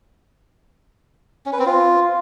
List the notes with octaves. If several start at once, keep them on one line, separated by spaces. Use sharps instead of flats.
C#4
B4
C4
F4